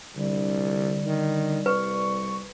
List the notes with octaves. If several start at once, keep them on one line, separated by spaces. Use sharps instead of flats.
C2 D3 G3
D#3
C2 B4 C#6